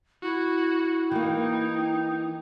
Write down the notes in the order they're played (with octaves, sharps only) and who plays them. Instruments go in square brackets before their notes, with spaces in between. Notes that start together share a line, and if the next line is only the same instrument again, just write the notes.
[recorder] E4 [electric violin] F#4
[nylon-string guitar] E3 A#3 [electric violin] D#4 [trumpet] G5